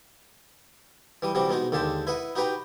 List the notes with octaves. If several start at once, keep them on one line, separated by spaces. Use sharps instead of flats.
E3 G3 D#6
C3 E3 G3 F#4 D6
B2 G#3 D#4 F#4
D#2 D3 G#3 G4 A5
E4 B4 D#5 F#5
D#4 F#4 G4 B4 G5 A#5